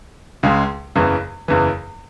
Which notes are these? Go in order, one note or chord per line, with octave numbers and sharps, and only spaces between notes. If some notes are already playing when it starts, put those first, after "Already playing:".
C#2 C#3 G#3
F#1 E2 C#3 E3
F#1 E2 C#3 E3